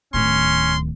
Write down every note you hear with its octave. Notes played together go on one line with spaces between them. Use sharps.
D1 D#3 C#4 C6